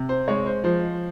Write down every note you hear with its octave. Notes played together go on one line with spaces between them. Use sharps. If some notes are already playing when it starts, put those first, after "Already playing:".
Already playing: C3
C5
G#3 C#5
C5
F3 C5